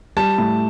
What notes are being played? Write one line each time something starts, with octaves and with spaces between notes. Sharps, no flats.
G3 A5
A2